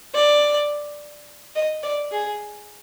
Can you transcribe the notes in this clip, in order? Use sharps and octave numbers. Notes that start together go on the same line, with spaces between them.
D5
D#5
D5
G#4